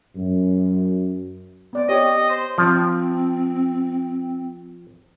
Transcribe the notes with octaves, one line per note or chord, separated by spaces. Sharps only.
F#2
B3 D5
G4 C#5 D#5
C5
F3 C4